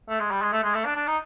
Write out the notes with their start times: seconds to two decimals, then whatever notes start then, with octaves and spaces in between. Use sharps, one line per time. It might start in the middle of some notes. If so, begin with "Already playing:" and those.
0.09 A3
0.20 G#3
0.31 G3
0.42 G#3
0.53 A3
0.64 G#3
0.75 A3
0.86 D4
0.96 D4
1.07 D#4